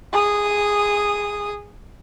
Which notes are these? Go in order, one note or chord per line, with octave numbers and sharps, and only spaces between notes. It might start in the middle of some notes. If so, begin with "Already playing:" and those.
G#4 D#6